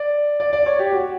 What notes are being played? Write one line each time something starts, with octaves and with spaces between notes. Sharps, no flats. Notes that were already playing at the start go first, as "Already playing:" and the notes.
Already playing: D5
D5
D5
C#5
G4
F#4